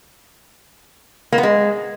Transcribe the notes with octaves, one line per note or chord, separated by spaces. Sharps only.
A#3
B3
G#3